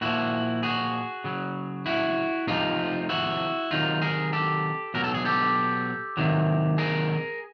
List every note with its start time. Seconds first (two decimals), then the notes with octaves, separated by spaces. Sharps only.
0.01 A#2 F3 E4 F#4
0.63 F#4 G#4
1.24 C#3 F#3
1.86 E4 F#4
2.47 C3 F3 D#4 F4
3.09 E4 F#4
3.71 C3 D#3 F#3 D#4 F4
4.02 G#4 A#4
4.33 G4 A4
4.94 B2 F#3 A#4
5.04 A4
5.14 G#4
5.25 G4 A4
6.17 C3 D#3 F#3
6.78 G#4 A#4